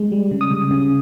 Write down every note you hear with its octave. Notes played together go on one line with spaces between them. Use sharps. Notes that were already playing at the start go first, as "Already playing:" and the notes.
Already playing: G#3
G3
C#3
D#6
C#3
C#3